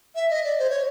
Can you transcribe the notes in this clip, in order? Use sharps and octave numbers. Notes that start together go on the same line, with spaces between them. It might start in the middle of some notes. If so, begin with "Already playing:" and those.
E5
D#5
D5
C5
C#5